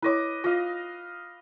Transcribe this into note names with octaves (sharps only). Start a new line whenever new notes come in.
E4 B4 C#5 D#5 D6
F4 D#5 F5